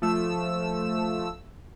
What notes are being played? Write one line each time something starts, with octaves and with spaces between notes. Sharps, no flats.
F3 A3 E6